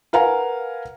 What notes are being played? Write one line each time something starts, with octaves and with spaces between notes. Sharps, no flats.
A#4 B4 F5 F#5 G#5 A#5